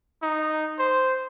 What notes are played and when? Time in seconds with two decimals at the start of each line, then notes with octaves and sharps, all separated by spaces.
0.22 D#4
0.79 C5